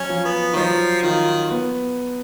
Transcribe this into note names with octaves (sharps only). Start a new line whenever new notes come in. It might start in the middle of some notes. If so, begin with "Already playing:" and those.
Already playing: F#3 C#4
F3
B3
D#3
F3 F#3
D#3 F4
B3